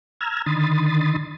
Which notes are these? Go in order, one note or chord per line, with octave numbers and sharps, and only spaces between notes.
A#5 E6 F6 G#6
D3 D#3 B5 C6 D#6 A6